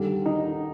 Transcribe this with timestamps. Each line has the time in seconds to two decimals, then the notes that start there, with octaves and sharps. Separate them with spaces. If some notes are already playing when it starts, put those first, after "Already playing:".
Already playing: D#2 D3 G3
0.26 D#4